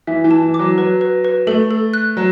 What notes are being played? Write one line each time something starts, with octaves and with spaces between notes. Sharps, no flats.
E3 E5
E3
A5
E3
D6
F#3
F#3 B4
B4
B4
A3 A4
A4
F#6
F#3